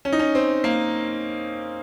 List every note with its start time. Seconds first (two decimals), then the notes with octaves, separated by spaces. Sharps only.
0.05 C#4
0.12 D#4
0.19 C#4
0.35 C4
0.64 A#3